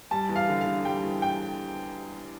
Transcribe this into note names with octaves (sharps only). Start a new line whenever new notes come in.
G3 A5
E2
F5
D3
F5
D3
G3 G5
E2
G5